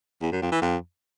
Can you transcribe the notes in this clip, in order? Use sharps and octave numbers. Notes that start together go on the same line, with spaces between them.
E2
F#2
F2
E3
F2